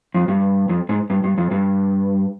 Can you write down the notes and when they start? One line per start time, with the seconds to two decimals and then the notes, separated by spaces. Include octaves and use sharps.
0.14 F2
0.28 G2
0.69 F2
0.89 G#2
1.10 G2
1.24 G2
1.38 F2
1.51 G2